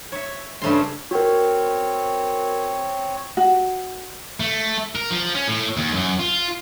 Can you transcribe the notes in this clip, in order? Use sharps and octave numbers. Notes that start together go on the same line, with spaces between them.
C#5 E5
G2 C#3 A3 C5 D#5 C6
C4 F#4 A#4 C#5
F#4
A3
A#4
F3
C#4
A2
D#2
F#2
F4